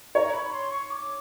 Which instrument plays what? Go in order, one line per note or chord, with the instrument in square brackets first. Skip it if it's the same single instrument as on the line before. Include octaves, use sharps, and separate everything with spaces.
[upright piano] C#5 [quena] A#5
[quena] B5
B5
C6
C#6
D6